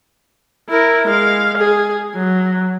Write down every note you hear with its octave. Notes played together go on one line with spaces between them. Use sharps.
E4 A#4
G#3 F5
G#4
F#3